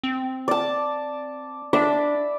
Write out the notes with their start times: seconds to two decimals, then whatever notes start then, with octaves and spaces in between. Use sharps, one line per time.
0.03 C4
0.48 D5 A5
1.73 D4 D5 E5 B5